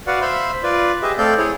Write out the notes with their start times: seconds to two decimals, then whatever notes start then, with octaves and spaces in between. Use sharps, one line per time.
0.07 F#4 B4 D5 F5 F#5
0.21 C5 E5 F5 B5 C6
0.63 F4 B4 D5
1.02 G4 G#4 B4 D#5 E5
1.18 A3 C4 A4 D5 F5 G6
1.38 E4 G#4 C#5